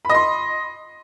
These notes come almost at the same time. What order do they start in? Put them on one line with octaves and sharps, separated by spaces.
B5 D#5 C6